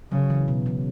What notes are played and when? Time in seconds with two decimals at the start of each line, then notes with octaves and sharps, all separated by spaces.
0.12 C#3 F#3
0.30 E3
0.48 B2
0.66 C#3